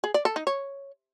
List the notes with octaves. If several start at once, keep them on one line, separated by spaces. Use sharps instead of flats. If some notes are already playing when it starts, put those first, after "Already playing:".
G#4
D5
A4
D#4
C#5